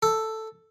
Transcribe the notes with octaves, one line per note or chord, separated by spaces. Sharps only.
A4